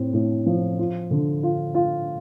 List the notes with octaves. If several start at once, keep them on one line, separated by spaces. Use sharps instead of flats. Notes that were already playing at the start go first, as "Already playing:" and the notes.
Already playing: A2 C4
A2
F3
F4
D3
F4
F4